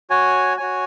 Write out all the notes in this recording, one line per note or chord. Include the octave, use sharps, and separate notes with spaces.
F#4 C#5 G#5
F#4 C#5 G#5